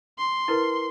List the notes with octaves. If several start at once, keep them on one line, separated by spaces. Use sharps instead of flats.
C6
E4 A#4 B4